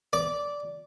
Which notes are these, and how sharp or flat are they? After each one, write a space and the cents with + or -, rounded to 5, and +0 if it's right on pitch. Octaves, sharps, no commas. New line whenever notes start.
D5 -10